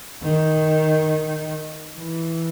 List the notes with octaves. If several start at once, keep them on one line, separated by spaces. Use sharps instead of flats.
D#3
E3